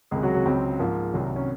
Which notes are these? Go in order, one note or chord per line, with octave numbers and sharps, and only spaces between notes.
C#2 C3 D#3 G#3 G#4
F#3 F#4
F#3 F#4
C#2 C#3 F#3 C4
G#2 F3 A#3
C2 C3 D#3 F#3
C#4